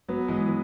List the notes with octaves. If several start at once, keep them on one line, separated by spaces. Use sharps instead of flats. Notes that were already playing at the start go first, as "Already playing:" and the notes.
F#3 B3
E3 G#3
E3